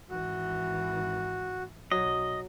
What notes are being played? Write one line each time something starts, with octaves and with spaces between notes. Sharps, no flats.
G#1 E3 F#4
B1 F#3 D#5